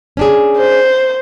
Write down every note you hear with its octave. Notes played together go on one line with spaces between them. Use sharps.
C#4 D4 G#4
C5